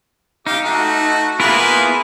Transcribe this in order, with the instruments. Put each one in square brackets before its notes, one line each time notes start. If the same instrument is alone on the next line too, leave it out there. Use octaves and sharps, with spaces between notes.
[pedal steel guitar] D#4 [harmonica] G4 F5
[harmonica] A3 F#4
[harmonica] A#3 G#4 B4 [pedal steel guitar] B3 E4 F4